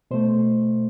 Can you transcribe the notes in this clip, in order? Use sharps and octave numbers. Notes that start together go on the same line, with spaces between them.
B2 A3 C5